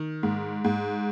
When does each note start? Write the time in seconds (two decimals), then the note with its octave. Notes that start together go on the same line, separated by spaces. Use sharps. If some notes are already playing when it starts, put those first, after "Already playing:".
Already playing: D#3
0.23 G#2
0.64 G#2